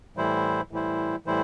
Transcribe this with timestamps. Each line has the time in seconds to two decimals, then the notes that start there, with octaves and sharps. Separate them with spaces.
0.17 A2 E3 G3 E4 C5
0.71 A2 E3 G3 E4 C5
1.26 A2 E3 G3 E4 C5